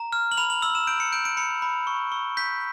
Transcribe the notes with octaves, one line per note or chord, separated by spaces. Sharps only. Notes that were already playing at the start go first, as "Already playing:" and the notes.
Already playing: A#5
F6
F#7
B5 F7
F#7
E6 F#7
E7
G6 D7
C#7
G6 D7
D7
B5 C#7
B5
C#6
C#6
G6 B6